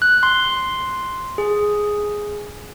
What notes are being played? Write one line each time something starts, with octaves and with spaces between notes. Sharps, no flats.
F#6
C6
G#4